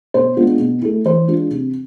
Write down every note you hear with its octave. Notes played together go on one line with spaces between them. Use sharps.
B2 C5
G#3 B3 D4 F4
B2
A3 E4
E3 C5
G#3 D4 F4
C3